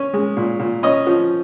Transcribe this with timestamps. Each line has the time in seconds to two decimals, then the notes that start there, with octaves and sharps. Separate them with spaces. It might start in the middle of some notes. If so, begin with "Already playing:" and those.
Already playing: C#4
0.14 G#3
0.37 A#2
0.59 A#2
0.83 C#4 D#5
1.07 F3